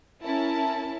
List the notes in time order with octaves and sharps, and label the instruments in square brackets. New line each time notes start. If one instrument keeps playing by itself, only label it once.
[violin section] C#4 E4 A#4 A5